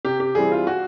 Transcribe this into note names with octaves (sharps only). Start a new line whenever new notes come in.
C3 G4
G4
E3 G3 C4 E4 G#4
F4
F#4